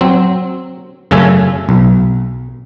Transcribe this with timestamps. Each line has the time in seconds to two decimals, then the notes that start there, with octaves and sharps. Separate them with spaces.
0.01 F#3 C4
1.11 F#2 C#3 A3 C#4 E5 G#5
1.69 B1